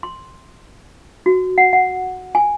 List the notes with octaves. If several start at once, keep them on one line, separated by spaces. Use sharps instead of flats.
C6
F#4
F#5
F#5
G#5